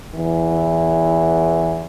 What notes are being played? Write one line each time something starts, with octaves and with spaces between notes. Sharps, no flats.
E2 E3